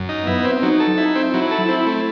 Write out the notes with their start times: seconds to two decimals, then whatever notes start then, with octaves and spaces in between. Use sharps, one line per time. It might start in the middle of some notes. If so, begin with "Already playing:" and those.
Already playing: F#2
0.09 D#4
0.27 B3 E4
0.44 C4
0.62 F#3 D#4
0.80 A4
0.98 D#4 E4
1.15 C4
1.34 F#3 E4
1.51 A4
1.69 C4
1.87 A3